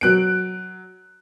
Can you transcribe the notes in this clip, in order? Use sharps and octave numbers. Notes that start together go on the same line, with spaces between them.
F#3 F#6 D7